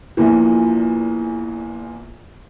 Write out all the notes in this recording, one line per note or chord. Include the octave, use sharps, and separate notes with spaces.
A#1 E2 A#2 E3